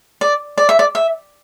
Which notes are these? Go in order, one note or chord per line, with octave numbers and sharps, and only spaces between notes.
D5
D5
E5
D5
E5